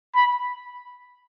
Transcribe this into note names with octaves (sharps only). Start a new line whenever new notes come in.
B5